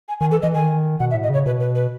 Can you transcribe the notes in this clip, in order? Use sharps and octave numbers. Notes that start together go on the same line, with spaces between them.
G#5
D#3 G#5
E3 A4
E3 D#5
D#3 G#5
B2 F#5
E5
A2
D#5
C#3 C#5
B2 B4
B4
B4